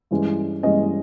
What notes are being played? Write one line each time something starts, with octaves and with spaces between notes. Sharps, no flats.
G2 E3 G#3 C#4
G2 E3 G#3 C#4 D#5